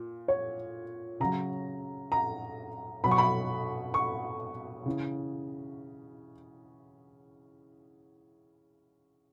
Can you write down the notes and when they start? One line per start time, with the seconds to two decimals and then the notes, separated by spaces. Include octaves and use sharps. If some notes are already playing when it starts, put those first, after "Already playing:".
Already playing: A#2
0.28 C#5
1.20 C#3 F#3 A#5
2.12 A#5
3.04 B2 F#3 B5
3.11 C#6
3.18 B5
3.94 C#6
4.86 C#3 E3